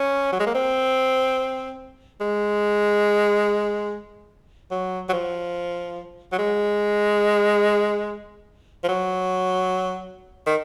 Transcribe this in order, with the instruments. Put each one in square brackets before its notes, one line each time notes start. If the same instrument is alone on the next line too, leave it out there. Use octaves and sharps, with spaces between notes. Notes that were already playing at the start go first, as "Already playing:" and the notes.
Already playing: [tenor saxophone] C#4
F#3
G#3
A#3
C4
G#3
F#3
F#3
F3
F#3
G#3
F3
F#3
D#3